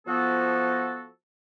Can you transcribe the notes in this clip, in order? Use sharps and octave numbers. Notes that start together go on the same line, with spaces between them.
F3 B3 F#4 A4